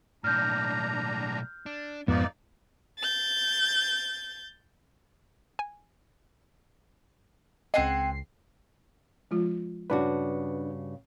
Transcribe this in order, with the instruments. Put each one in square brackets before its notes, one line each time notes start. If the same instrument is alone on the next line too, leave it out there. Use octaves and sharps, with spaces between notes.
[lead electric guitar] B1 A2 [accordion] D4 A#5 [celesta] F6 G6
[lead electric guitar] D4
[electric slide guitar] F2 G#2 B3 [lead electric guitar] F3 [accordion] A#3 D#4 D5
[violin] G6 A6
[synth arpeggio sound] G#5
[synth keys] C#2 C7 [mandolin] C4 F#5 G#5 [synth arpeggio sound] D#5
[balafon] F3 G#3 F4
[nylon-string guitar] G2 C#3 F#4 [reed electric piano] D4 B4